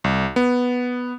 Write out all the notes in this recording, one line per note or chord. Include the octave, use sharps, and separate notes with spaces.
C2
B3